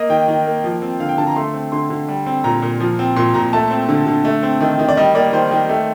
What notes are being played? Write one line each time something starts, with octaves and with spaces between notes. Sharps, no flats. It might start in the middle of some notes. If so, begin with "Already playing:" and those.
Already playing: A#3 D#5
D#3 G5
D#3
A#3
F3
C4
D3 F5
G5
D3 A5
A#5
A3 C6
C4
D3 C6
D3
G3
C4
A#2 A#5
A#2
F3
C4
A#2 C6
A#2 A#5
A3 A5
C4
D3
D3
A3
C4
D#3
D#3
D5
G3 D#5
A#3 D5
D#3 C5
D#3
A3